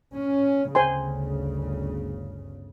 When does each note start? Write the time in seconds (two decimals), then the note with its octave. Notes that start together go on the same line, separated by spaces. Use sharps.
0.16 C#4
0.75 G1 D2 C#3 C5 G#5 C6